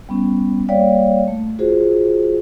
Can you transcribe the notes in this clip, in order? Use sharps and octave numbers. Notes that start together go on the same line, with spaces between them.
G3 B3 C#4
G3 A#3 C#5 D5 F5 G5
A3
F4 F#4 G#4 C5